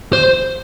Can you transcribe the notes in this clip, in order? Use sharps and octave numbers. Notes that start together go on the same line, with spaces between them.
C5